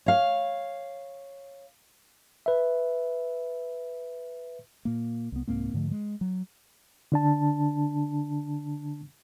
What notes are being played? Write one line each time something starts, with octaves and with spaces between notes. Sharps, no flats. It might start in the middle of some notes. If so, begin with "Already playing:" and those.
C#5 F5
B4 E5
A#2 A#3
C2 B3
C2 G#2 A#3 C4
G#2 D3 F3 A3
G#3
F#3
D3 D4 A5